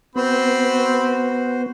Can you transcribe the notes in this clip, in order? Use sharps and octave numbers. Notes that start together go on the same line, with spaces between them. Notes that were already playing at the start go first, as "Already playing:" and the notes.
B3 C4 F#4 C5 B5